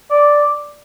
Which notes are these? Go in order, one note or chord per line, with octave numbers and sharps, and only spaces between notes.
D5